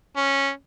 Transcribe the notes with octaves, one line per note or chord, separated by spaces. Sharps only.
C#4